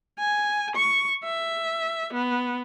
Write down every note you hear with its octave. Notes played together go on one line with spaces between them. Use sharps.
G#5
C#6
E5
B3